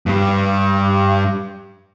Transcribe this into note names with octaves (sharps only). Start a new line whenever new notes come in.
G2 G3